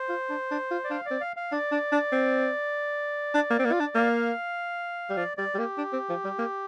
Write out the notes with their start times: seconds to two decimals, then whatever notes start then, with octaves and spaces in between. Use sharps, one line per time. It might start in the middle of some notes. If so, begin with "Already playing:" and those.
Already playing: C5
0.09 F4
0.30 D4
0.51 D4
0.71 F4
0.84 D5
0.91 D4 F5
1.06 C4 D5
1.21 F5
1.37 F5
1.52 D4 D5
1.72 D4
1.92 D4
2.12 C4
3.35 D4
3.51 A#3
3.59 C4
3.65 A#3
3.72 F4
3.80 D4
3.95 A#3 F5
5.10 G3
5.17 F3 D5
5.37 G3 D5
5.54 G3
5.58 A#3 G4
5.78 D4
5.93 C4
6.09 F3
6.25 G3
6.39 A#3